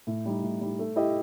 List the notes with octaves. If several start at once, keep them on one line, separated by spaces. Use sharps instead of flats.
A2
G3 D#4
A2
G3 D#4
A3
E4 G4 D#5